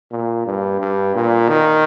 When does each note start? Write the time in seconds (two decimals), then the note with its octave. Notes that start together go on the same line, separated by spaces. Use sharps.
0.11 A#2
0.46 G2
0.80 G2
1.15 A#2
1.49 D#3